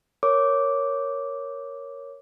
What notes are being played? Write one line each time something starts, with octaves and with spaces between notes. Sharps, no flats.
A#4 C#5 D6